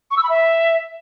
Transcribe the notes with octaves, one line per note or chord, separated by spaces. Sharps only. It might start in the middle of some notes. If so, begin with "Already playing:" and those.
C#6
E6
B5
E5